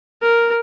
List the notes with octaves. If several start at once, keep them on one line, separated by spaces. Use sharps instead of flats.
A#4